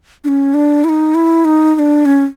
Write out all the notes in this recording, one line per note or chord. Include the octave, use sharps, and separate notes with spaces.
D4
C#4
D4
E4
D#4
E4
D#4
D#4
D4
C#4